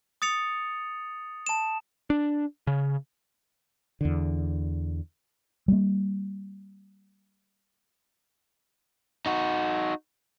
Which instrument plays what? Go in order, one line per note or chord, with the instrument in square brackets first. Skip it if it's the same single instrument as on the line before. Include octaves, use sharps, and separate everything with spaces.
[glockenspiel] D#6 A6 C#7 F7
A5 E7
[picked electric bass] D4
C#3
[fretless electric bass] E2 D3
[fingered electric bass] G3 A#3
[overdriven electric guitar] D#4 F#4